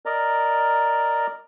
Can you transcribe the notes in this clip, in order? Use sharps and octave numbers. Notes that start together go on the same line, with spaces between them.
A#4 D5 D#5 A#5